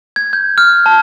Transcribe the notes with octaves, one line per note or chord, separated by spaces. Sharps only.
G#6
G6
F6
A5